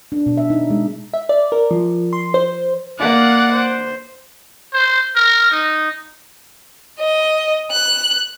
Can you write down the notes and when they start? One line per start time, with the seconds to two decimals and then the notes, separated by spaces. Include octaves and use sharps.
0.12 D4
0.26 B2
0.37 E5
0.50 D#4
0.70 G#3
1.14 E5
1.29 D5
1.52 A#4
1.71 F3
2.13 C6
2.34 C5
2.99 A#3 D5 F5 F#5
3.52 C5
4.74 C5
5.16 A#4
5.51 D#4
6.99 D#5
7.71 F#6